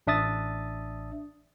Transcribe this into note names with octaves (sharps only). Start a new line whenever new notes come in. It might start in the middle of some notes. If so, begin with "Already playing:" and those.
A1 D4 E5 D#6 A6